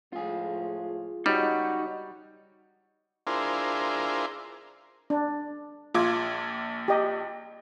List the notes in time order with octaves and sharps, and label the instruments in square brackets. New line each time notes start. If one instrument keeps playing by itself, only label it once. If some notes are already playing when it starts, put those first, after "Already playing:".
[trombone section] A2 F3 G#3 [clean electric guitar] F4 G#4
[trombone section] C#2 F#4 [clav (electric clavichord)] G3 [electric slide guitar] D#4 C#5 D#5
[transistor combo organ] D4 E4 F4 G#4 A#4 C5
[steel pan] D4
[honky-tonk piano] A#1 D6 G#6 [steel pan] F4
[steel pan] G4 D#5